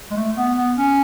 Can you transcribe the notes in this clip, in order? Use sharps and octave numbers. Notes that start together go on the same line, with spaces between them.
G#3
A3
B3
B3
C#4